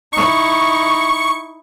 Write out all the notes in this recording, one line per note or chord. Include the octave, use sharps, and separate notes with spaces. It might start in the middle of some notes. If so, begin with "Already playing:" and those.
D#4 E4 C#6